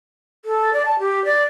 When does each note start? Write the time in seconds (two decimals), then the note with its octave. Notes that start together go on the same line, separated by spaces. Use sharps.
0.45 A4
0.73 D5
0.85 A5
0.99 G4
1.25 D5